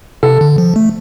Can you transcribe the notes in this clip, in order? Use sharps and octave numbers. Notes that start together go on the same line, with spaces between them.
C3 A4
D3
F3
A3